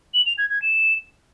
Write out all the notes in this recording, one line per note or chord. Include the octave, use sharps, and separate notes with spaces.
F#7
F7
G#6
G#6
E7